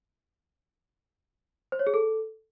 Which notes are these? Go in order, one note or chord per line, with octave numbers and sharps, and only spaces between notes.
C5
C#5
G#4
A4